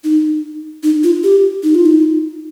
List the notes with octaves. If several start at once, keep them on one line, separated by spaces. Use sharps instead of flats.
D#4
D#4
F4
G4
D#4
F4
D#4